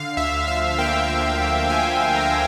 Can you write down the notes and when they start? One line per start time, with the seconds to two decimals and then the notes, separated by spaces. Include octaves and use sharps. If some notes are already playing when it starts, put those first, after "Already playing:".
Already playing: D3 F5
0.17 D2 E5
0.47 F3 F5
0.78 A#3 G5
1.09 D3
1.39 D2
1.70 F3 G#5
2.00 A#3
2.16 A#5
2.31 D3